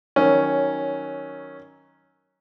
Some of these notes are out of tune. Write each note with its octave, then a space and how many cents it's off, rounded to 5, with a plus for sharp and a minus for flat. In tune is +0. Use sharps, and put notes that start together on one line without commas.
D#3 +0 F#3 +10 C#4 +0